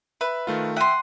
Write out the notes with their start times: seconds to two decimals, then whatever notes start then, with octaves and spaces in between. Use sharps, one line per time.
0.21 B4 E5
0.47 D#3 A3 F4
0.77 E5 F#5 G5 C6 D#7